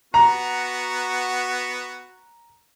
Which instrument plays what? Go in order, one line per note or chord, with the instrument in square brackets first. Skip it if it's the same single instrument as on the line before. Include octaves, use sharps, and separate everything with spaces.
[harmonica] B3 F#4 [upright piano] A#5